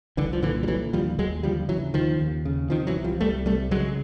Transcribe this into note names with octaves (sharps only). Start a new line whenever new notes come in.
C2 D3 E3
F3
A#2 D3 E3
G3
D3 E3 F#3
D#2 F3 G3
D#2 F#3 G#3
D3 F3 G3
C#3 E3 F#3
D#2 D#3 F3
D#2
C#3
C3 D#3 F3
E3 F#3
C2
F3 G3
C2 G3 A3
C3 G3 A3
C#3 F#3 G#3